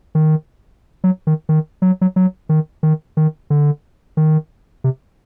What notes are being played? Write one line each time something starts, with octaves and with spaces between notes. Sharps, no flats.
D#3
F#3
D#3
D#3
F#3
F#3
F#3
D#3
D#3
D#3
D3
D#3
C3